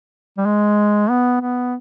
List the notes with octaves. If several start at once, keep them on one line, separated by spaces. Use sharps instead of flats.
G3
G#3
B3
B3